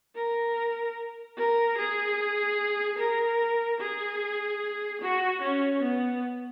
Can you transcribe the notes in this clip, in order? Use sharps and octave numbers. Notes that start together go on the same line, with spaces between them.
A#4
A#4
G#4
A#4
G#4
F#4
C#4
B3